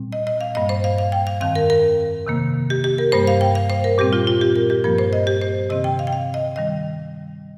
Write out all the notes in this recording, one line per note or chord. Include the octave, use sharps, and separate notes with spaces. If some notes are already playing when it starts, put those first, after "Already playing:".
Already playing: A#2 G3 C4
D#5
D#5
F5
G2 G3 A#3 D#5
C5
F5
F5
G5
F5
F2 D#3 C4 F5
A#4
A#4
C3 D#3 A#3
G4
G4
A#4
G2 G3 A#3 C5
F5
G5
F5
C5
A#4
A#2 G3 C4 G4
F4
F4
G4
A#4
G4
G2 F3 A#3 A#4
C5
D#5
G4
C5
C3 D#3 C4 D#5
G5
F5
G5
F5
D#5
D#3 G3 D#5